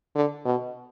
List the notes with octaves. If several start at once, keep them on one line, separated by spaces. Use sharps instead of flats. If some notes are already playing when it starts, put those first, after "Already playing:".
D3
B2